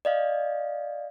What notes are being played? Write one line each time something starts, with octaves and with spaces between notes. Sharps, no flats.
D5 D#5 F5